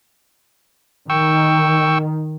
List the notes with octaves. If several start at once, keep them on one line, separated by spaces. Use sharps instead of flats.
D#3 G5 C#6 E6